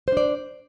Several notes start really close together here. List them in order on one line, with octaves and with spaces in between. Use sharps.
C5 D4 D5